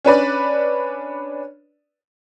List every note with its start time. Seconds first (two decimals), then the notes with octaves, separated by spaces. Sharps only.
0.05 C#4 D4 B4 D5